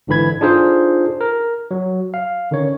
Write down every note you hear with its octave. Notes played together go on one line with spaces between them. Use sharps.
G#1 G#2 D3 E3 B5 G#6
D4 D#4 F4 G#4 A4 C5
A#4
F#3
F5
D3 D#3 C#4 C#5